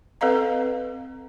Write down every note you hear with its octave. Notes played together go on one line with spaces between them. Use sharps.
C4 A4 B4 D#5 F5 A#5